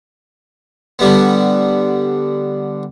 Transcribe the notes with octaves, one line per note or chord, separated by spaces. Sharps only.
D3 G3 B3